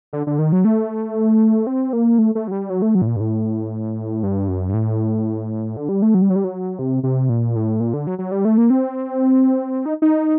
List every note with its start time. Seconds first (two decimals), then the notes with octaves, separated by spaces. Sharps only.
0.13 D3
0.27 D3
0.39 D#3
0.52 F#3
0.65 A3
1.67 C4
1.93 A#3
2.18 A3
2.35 A3
2.47 F#3
2.51 G3
2.70 F#3
2.82 A3
2.95 F#3
3.02 A2
3.07 A#2
3.16 G2
3.20 A2
4.23 G2
4.48 F#2
4.69 G2
4.74 A2
5.77 D3
5.89 G3
6.02 A3
6.14 F#3
6.22 G3
6.30 F#3
6.36 G3
6.44 F#3
6.79 C3
7.03 C3
7.29 A#2
7.56 A2
7.80 A#2
7.94 D3
8.07 F#3
8.18 F#3
8.32 G3
8.45 A3
8.58 A#3
8.70 C4
9.86 D#4
10.02 D#4